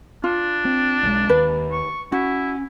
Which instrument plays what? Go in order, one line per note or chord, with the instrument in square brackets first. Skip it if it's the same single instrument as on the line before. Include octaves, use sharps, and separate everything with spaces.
[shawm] D4 [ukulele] F4
[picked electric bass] C4
B1 D#3 G#3
[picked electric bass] D#2 [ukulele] B4
[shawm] C#6
[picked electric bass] C#4 [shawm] E4 [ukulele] F#4